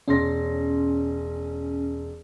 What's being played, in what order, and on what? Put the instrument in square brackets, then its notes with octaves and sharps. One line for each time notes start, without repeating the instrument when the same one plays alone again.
[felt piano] E1 C6 A#6 [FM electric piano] C#4